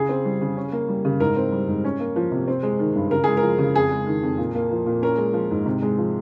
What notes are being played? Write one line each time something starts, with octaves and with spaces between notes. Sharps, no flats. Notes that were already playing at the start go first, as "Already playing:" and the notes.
Already playing: C#3 G#4
C4
G3
C#3
C#4
A#3
G3
C#3
G#2 A#4
C4
G3
G#2
C#4
A#3
F3
C3
C4
G#3
D#3
G2
C#3 A#4
G#3 G#4
A#4
F3
C#3
F2 G#4
G#3
D#3
F2
A#2
A#3
F3
A#2
C#4 A#4
G#3
F3
G#2
C3
G#3
F3